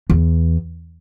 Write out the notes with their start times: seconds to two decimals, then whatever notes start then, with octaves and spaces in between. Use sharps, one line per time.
0.10 E2